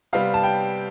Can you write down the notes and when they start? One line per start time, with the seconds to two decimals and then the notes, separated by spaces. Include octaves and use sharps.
0.13 C3 G3 B3 F5
0.34 A5
0.44 G5